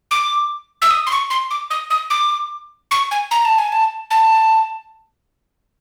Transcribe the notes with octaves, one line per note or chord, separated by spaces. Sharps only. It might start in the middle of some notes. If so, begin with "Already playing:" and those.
D6
E6
D#6
C6
C#6
C6
D6
D#6
D#6
D6
C#6
G#5
A#5
A5
G#5
A5
A5